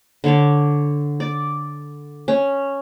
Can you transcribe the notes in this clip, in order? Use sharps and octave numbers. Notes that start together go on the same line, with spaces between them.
D3 C#5 D5
D5
C#4